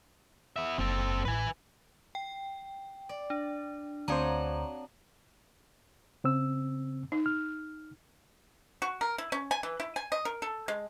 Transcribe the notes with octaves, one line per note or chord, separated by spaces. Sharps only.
B3 E5
F#1 C4 A4
A1 B4 G#5
G5
D5
D4
D2 C4 D4 F#4 C5 C#5 A#5
C#3 C4 E6
D#4
F6
F#4
A#4
E4
C#4
G#5
E3
E4
G#5
D#5
A#4
A4
G#3